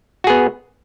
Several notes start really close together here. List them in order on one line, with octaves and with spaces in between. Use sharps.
F#4 G#4 B3